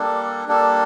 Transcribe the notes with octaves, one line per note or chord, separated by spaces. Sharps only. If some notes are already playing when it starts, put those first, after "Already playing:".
Already playing: G3 A#3 D4 A4
G3 A#3 D4 A4